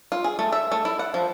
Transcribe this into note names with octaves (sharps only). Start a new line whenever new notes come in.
F4
G#4
A3
E5
A3
E4
F#5
F3